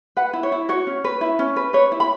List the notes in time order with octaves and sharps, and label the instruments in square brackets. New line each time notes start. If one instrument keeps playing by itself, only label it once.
[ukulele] B4 F#5
E4
C#5
E4
F#4 C#5
C#4
B4
E4
C#4
B4
B4 C#5
E4
B5